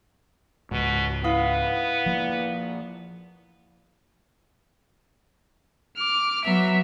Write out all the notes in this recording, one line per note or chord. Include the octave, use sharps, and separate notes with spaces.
C#2 G#2 B2
B3 E4 F5 D#6
F3 A#3
D6 F6
F#3 B3 E5